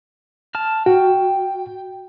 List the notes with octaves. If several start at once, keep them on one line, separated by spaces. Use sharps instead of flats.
A5 F6
F#4 G5